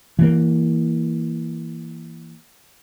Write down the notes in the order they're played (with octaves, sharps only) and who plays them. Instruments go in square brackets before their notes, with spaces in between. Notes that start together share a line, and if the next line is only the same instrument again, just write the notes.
[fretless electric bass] E3 A#3